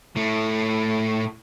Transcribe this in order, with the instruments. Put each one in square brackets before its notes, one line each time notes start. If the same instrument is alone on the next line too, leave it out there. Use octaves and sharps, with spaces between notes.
[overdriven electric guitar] A2 A3